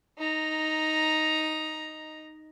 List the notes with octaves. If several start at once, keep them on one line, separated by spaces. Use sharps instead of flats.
D#4 A#5